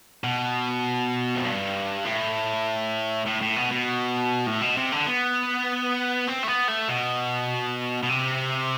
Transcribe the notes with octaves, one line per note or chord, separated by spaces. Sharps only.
B2
F2
G2
A2
A2
A2
B2
B2
A2
B2
C3
D3
B3
C4
A3
B3
A3
B2
B2
C3